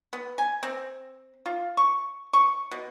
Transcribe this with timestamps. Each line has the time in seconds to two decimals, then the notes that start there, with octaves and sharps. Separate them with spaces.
0.13 B3
0.38 G#5
0.63 C4
1.46 F4
1.77 C#6
2.33 C#6
2.71 B2